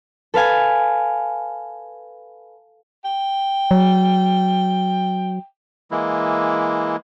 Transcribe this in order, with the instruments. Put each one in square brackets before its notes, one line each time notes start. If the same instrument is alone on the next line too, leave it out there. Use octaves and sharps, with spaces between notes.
[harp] A4 B4 F5 G#5
[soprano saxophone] G5
[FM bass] F#3
[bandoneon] E3 G#3 A#3 E4